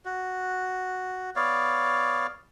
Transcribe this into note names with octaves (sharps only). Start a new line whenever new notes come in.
F#4
B3 C#5 D5 F5